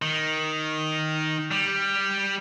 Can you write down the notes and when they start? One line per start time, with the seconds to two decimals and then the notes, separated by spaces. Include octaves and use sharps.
0.02 D#3
1.51 G3